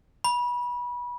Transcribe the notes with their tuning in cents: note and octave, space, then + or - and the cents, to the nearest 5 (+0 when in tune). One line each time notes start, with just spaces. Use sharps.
B5 -25